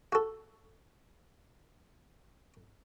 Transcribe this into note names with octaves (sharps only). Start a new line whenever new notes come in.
F#4 A4